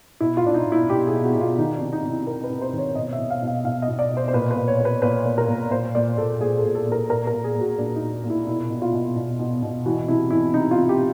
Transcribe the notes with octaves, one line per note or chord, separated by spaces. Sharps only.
B2 E4
F4
B2 D4
D#4
B2
E4
B2 G4
G#4
B2
F#4
B2
F4
D#3 D#4
D4
C3
D#4
C3
E4
C3 A#4
B4
C3
C5
D#3
C#5
B2 D#5
E5
B2
F5
B2
F5
B2 F5
D#5
B2
D5
B2
C5
C5
A#2 B4
B4
A#2
C#5
A#2 B4
A#2 B4
A#2
A#4
A#2
A#2 C5
A#2 D5
A#2 A4
A#2 G#4
A4
A#2
A4
A#2
A#4
A#2 A#4
A#4
A#2
G#4
A#2 F#4
A#2 D4
D#4
A#2
A#2
E4
B2 E4
B2
F4
B2
B2
B2
B2
E3 F#4
C3 E4
E3 E4
C3 D#4
F4
C3
G4